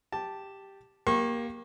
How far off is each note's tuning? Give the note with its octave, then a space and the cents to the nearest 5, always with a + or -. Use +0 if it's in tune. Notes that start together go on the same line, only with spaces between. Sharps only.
G4 +0 A5 +0
A#3 +15 G4 +0 C#6 -30